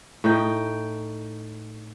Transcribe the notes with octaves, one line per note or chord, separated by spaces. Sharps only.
A2 D#4 G5